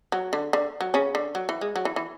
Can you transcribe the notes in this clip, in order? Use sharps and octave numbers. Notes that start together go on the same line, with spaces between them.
F#3
D3
D3
F#3
C#3 C#4
D3
F#3
E3
G#3
F#3
E3
E3